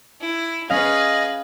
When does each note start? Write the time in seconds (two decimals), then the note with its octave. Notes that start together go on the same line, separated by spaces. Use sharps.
0.21 E4
0.70 C#4 G#4 B4 D#5 F5